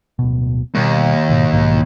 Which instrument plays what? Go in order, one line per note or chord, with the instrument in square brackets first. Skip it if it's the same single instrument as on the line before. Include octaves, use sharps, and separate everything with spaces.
[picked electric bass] D1 B2
[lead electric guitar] D#2 [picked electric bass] B2 G3 A#3
[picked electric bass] G#2 B2 D#3
B1 G#2 B2